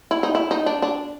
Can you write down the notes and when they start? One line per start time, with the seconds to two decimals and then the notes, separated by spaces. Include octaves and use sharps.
0.11 E4
0.23 D#4
0.35 E4
0.51 D#4
0.66 D4
0.82 D4